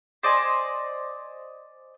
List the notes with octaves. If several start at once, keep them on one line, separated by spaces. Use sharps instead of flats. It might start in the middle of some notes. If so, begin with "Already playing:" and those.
C5 D5 D#5 G#5